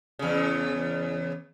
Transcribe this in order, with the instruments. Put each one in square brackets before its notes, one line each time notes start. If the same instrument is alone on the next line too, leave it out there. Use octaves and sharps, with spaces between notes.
[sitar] E2 C#3